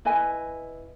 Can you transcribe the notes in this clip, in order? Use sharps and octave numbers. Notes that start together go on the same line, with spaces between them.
E4 B4 D#5 G#5